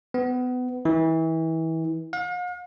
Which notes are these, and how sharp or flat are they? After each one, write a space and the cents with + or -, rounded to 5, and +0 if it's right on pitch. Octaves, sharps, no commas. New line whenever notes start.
B3 +25
E3 -30
F5 +45